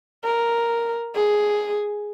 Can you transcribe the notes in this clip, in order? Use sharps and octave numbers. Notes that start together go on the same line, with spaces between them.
A#4
G#4